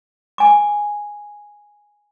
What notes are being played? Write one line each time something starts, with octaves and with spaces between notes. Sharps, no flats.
G#5 D6